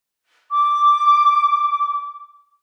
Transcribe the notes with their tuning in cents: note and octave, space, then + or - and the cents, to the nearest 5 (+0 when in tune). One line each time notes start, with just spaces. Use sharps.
D6 -5